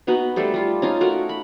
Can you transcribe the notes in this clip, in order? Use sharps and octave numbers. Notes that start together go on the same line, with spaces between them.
B3 D#4 F#4 B4
G3 A3 A4 C5
G3 F4
C#4 D#4 F4
A3 F#4 A#4
B5